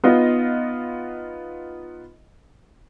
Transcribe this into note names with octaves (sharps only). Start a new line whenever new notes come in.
B3 D#4 F4 D#5